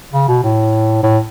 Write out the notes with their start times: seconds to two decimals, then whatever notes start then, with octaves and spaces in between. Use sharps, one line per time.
0.12 C#3
0.28 B2
0.43 A2
1.03 A2